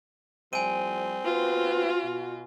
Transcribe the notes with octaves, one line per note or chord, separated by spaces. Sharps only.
A2 F3 G3 C4 G#5 D#7
D#2 B3 F4 F#4 B4
B2